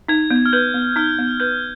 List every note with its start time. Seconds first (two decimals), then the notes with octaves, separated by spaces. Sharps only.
0.08 D#4 G#6
0.31 B3
0.46 F6
0.53 B4 G6
0.74 B3
0.96 D#4 F6
1.19 B3
1.40 B4 G6